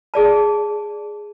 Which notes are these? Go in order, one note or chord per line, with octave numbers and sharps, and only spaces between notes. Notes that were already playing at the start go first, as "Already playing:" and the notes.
G#4 D5 A5